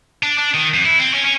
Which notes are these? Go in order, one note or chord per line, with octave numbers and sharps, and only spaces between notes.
D4
D4
D#3
F2
E4
C4
C#4
C#4